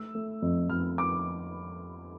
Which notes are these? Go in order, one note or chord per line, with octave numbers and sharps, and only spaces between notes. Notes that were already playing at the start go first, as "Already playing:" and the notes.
Already playing: A3 E6
A3
F2
F2 F6
D6